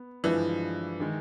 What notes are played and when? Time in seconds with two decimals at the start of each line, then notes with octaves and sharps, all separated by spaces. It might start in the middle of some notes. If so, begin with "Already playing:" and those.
Already playing: B3
0.23 G2 D3 E3 F3 G#3
1.00 D#3 G#3